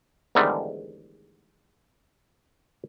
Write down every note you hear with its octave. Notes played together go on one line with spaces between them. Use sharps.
E2 G#2 D3 D#3 G3 A3